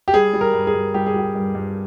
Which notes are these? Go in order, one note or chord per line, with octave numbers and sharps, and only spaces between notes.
G4
G3 G#4
G3
A#4
G2
G#4
G2
G3 G4
G#4
G3 G4
G2
G2